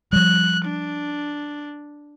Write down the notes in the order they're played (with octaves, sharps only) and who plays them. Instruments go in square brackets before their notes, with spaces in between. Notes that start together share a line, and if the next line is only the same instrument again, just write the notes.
[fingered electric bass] F3 G3 [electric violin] F#6
[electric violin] D4